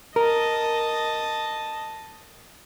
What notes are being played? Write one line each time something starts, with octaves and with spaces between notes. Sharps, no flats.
A#4 D#5 A5